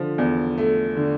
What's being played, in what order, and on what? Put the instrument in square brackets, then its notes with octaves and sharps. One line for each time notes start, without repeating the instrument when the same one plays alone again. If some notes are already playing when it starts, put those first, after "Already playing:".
Already playing: [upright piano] D3 F3
E2
A3
D3